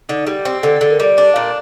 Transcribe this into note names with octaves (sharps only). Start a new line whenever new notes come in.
D3 D#4
G3
C4
D3 A4
A4
D3
A#4
G3 D5
D4 D5
A#2